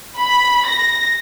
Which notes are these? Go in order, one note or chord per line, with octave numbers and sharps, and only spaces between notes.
B5
A#6